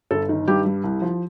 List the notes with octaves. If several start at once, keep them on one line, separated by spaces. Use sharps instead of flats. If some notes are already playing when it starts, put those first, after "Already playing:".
G1 A4
D#3
G2 G4
G3
C2
F3